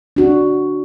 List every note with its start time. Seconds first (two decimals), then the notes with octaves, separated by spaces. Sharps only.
0.16 D4 F#4